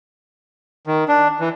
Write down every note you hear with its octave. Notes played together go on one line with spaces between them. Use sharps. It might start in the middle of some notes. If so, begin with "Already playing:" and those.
D#3
D4
E3